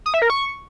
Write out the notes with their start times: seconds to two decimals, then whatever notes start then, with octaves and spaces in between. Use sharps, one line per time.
0.06 D#6
0.14 E5
0.22 A#4
0.30 C#6